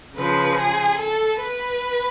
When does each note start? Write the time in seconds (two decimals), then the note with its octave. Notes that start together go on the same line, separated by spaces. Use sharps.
0.15 C#3 F3 B4
0.57 G#4
0.99 A4
1.40 B4